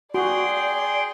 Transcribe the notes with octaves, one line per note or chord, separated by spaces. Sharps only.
F#4 G#4 D5 G5 C6